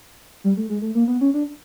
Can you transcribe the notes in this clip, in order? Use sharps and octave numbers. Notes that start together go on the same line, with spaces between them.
G3
A3
G#3
A3
A#3
B3
C#4
D4